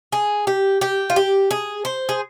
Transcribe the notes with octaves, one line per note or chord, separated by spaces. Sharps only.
G#4
G4
G4
F4
G4
G#4
C5
G#4